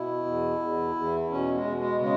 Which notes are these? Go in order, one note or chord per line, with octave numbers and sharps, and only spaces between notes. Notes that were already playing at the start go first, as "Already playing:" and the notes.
Already playing: B2 E4
E2
E2
E2
B2 C#4
G#3
B2
G#3
C#3 G#3